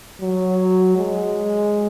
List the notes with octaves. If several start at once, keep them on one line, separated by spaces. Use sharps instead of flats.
F#3
G#3